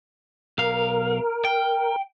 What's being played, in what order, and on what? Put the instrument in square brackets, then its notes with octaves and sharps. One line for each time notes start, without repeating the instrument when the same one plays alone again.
[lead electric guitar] B1 F5 [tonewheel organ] A#4
[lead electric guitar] G5